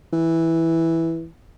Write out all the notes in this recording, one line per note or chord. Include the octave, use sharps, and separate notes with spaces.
E3